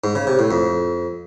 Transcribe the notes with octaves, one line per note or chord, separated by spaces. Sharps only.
G#2
C#3
C3
A2
F2